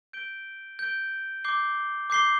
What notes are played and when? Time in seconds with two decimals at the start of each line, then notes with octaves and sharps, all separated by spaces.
0.13 G6 D7 G7
0.79 G6 D7 G7
1.44 D6 G6 C7 G7
2.10 D6 G6 C7 G7